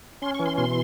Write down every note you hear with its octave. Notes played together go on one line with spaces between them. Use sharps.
C#4 C6
C#6
E3
C6
B2 C6